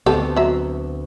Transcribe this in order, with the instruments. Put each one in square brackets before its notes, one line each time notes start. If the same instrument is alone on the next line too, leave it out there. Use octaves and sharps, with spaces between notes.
[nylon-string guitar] D2 B3 C4 [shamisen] G4 A4
[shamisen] F#3 E5